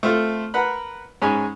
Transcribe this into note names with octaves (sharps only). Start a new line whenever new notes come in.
A3 C4 F4 A4
A#4 B4 F#5 B5
G#2 G#3 C#4 G#5 B5